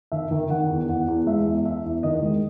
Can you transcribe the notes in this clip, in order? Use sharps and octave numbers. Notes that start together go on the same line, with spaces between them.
D#3 E5
D#3
D#3 F#5
E2
E2 F#5
E2
G#3 E5
E2
E2 E5
E2
D#3 D#5
G#3